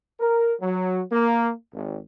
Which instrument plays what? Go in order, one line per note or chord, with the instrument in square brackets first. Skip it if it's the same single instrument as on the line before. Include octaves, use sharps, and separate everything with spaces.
[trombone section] A#4
F#3
A#3
G#1